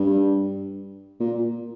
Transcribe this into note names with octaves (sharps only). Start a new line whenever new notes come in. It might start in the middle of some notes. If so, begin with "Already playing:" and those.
Already playing: G2
A#2